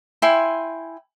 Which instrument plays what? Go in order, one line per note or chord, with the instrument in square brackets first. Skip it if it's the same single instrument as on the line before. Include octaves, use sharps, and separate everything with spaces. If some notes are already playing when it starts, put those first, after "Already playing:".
[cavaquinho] E4 G5 G#5 C6